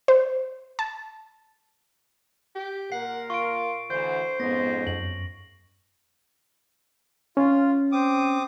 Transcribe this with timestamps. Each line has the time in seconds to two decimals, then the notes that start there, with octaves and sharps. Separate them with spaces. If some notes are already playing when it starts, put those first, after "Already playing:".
0.08 C5
0.79 A5
2.56 G4
2.92 A#2 A#4 F#5 C7
3.30 F4 C#6 D7
3.90 D2 D3 E3 C5 G6
4.40 F2 G#2 B3 C#4 A#6
4.87 F#2 F#7
7.37 C#4 F4
7.92 C4 D6 D#6